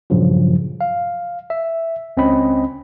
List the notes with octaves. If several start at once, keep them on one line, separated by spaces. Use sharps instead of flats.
G2 A#2 C#3 F3 F#3
F5
E5
C#2 C4 C#4 D#5 B5